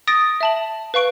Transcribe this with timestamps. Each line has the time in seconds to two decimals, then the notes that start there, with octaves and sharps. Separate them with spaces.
0.07 D#6 A6 A#6 D7
0.41 E5 A5 F#7
0.94 B4 F5 C#6 D7